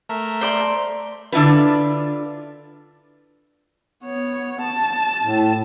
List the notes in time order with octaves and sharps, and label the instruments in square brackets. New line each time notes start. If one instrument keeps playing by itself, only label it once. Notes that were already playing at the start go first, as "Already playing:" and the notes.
[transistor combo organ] A3 A#4 E5
[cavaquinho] C5 D5 C6
[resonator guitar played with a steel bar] D3 D4 E4 F4 B4
[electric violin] B3 C#5
A5
[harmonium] A2